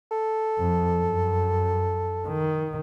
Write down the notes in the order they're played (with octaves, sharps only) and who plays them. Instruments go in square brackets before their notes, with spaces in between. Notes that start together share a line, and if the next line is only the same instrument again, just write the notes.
[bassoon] A4
[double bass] F2
F#2
D#3